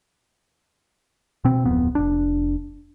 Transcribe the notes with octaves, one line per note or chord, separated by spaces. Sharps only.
B2 C4
D1 F2 B3
F1 D4